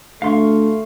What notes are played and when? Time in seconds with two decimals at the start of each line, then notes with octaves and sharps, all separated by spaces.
0.22 D2 A3 F5 C6 C#6